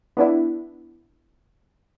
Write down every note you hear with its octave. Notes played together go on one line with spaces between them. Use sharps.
B3 D4 E4